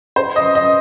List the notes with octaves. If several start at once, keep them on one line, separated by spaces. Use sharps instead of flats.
C5
D#5
D#5